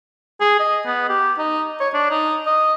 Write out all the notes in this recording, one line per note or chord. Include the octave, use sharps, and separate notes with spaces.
G#4
D#5
B3
G4
D#4
C#5
D4
D#4
D#5